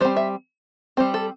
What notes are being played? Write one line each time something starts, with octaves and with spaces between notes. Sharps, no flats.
G3 C4 C5
E5
G3 C4 C5
A4